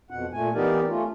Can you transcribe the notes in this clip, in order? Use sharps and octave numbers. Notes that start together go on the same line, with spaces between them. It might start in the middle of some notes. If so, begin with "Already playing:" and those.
F2 B2 F#5
A#2 A3 G#5
E3 B3 D#4 G4 A#4 D5
A3 C#4 F4